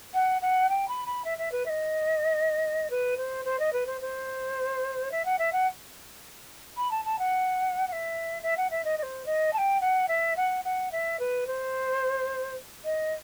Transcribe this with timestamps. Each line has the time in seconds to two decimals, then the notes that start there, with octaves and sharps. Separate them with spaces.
0.14 F#5
0.42 F#5
0.70 G5
0.88 B5
1.06 B5
1.25 E5
1.38 E5
1.52 B4
1.66 E5
1.69 D#5
2.90 B4
3.17 C5
3.45 C5
3.59 D#5
3.73 B4
3.87 C5
4.01 C5
5.12 E5
5.25 F#5
5.39 E5
5.53 F#5
6.77 B5
6.91 A5
7.05 A5
7.19 F#5
7.88 F#5
7.92 E5
8.43 E5
8.57 F#5
8.71 E5
8.85 D#5
8.98 D#5
9.03 C5
9.26 D#5
9.53 A5
9.58 G5
9.81 F#5
10.08 E5
10.37 F#5
10.65 F#5
10.92 E5
11.20 B4
11.47 C5
12.85 D#5